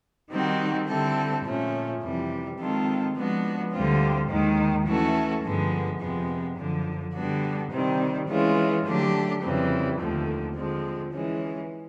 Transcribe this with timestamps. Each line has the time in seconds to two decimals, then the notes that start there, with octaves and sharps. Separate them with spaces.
0.30 D#3 G3 C4 D#4 F#4
0.87 D3 G3 C4 E4 A4
1.44 A#2 F3 A3 C#4
2.01 F2 C3 E3 G3
2.58 D#3 G#3 C4 F4 A4
3.15 F3 G#3 B3 D4 F#4
3.72 D2 D3 G3 C4 F4
4.29 D#2 D#3 G#3
4.86 E3 A3 C#4 F#4 A4
5.43 G2 D3 F3 G#3 B3
6.00 F2 C3 F3 G#3 B3
6.56 F#2 D3 F3
7.14 D3 G3 B3 D4 F#4
7.71 C3 D#3 G3 C4
8.27 E3 G#3 C#4 F4
8.85 D3 F#3 A3 D4 G4
9.42 F2 C#3 E3 G3 C4
9.99 D#2 D3 F3 A3
10.56 D3 F3 G#3 C4
11.12 E3 G#3 C#4